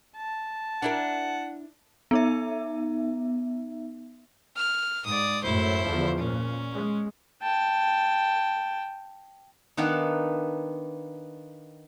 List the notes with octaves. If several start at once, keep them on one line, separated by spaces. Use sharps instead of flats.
A5
D4 E4 A#4 F#5
B3 D#4 E5
F6
G#2 D5 D#6
F#2 A2 E4 C5
E2 D3 F3
A#2 C#4
G#3
G5 A5
D#3 B3 D4 A#4 F5 F#5